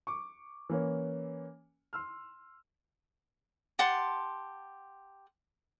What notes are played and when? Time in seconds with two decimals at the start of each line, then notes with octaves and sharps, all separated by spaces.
0.07 C#6 D6
0.69 E3 A#3 C#4 C#5
1.93 C6 E6 F6
3.79 G4 F#5 A5 C6